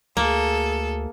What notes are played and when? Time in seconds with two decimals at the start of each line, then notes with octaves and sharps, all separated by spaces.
0.17 D2 A#3 G#4 A4 E6